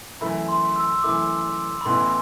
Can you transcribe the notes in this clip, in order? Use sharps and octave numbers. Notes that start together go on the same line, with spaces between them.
F#2 E3 A3 E4 B5
C6
E6
E6
F#2 E3 A3 E4 D6
B5
A1 A2 E3 B3 E4 C6